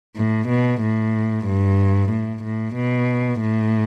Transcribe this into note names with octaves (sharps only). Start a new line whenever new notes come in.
A2
B2
A2
G2
A2
A2
B2
A2